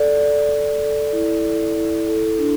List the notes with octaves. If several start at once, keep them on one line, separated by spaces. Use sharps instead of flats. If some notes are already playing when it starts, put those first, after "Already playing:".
Already playing: A4 D5
D5
D5
A4
E4
A4
E4
A4
D4